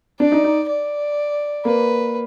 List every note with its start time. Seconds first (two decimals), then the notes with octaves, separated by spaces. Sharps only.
0.20 D4 D5
0.32 D#4
0.44 D#4
0.69 D5
1.65 A#3 B4